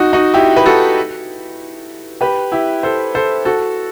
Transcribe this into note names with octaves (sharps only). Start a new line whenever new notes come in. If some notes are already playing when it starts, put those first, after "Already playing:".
Already playing: D#4 F#4
D#4 F#4
E4 G4
B4
F#4 A4
G4 B4
E4 G4
A4 C5
A4 C5
F#4 A4